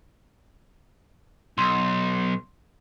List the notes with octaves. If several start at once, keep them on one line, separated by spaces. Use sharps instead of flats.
B1 C6